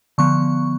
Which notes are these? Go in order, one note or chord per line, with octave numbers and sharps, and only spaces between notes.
D3 F3 B3 C#6